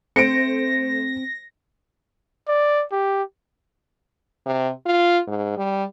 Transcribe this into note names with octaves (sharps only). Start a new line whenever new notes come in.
A3 C4 C5 A#6 C#7 D7
D5
G4
C3
F4
G#2
G3